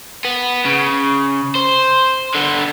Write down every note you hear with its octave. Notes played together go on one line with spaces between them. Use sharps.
B3
C#3
C5
D3 B3